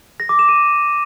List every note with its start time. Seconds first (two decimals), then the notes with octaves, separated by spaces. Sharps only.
0.20 A#6
0.29 D6
0.39 E7
0.49 D#7